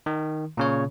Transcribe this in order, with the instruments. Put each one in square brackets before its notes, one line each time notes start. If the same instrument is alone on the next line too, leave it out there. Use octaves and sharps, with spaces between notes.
[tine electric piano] D#3
A#2 C#3 C#5